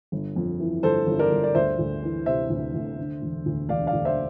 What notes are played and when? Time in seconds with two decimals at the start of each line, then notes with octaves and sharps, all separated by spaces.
0.12 G1
0.36 F2
0.60 E3
0.83 G1 A4 C5
1.07 G1
1.19 A#4 D5
1.31 G1
1.44 D5
1.55 D2 C5 E5
1.79 D2
2.03 E3
2.26 C3 C5 E5
2.50 D2
2.74 D2
2.98 D3
3.22 E1
3.46 D2
3.69 E1 D5 F5
3.87 D5 F5
3.93 D2
4.05 C5 E5